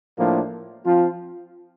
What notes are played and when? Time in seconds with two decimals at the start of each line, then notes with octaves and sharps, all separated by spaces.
0.17 A2 F3 A#3 D4
0.84 F3 C4 F4